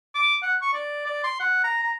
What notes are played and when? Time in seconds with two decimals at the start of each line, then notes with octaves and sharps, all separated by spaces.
0.15 D6
0.42 F#5
0.62 C#6
0.74 D5
1.06 D5
1.24 C6
1.40 F#5
1.64 A#5
1.83 A#5